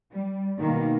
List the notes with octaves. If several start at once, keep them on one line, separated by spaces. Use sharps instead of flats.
G3
B2 D#3 A#3